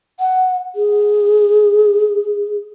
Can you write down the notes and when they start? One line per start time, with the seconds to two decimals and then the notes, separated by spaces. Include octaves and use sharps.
0.20 F#5
0.76 G#4